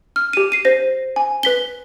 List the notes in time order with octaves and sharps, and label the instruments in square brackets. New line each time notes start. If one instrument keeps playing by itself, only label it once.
[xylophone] F6
G4 D#7
C7 D#7
C5 A#6
G#5
B4 B6 G7